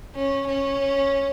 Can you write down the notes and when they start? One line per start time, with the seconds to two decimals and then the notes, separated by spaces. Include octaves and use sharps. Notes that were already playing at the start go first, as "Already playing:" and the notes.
0.15 C#4
0.48 C#4